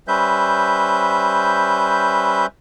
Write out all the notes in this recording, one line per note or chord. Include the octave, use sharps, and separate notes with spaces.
G3 C#4 B4 C5 E5 G6